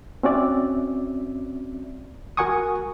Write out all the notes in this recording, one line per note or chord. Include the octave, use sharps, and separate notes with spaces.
C4 C#4 F#4 D5 E5
F#4 A#4 F#5 G#5 C#6 D#6